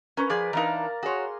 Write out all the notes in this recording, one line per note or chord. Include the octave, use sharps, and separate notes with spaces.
C#4 A#4 B4 C#5
F3 G#4 B4 D5
E3 D4 D#4 A#4 F5 A#5
F#4 G#4 C#5 C6